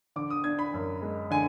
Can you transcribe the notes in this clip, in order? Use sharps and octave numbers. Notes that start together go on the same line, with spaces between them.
D3 D6
D#6
D4 G#6
B5
F#2
G#3
D3 G#5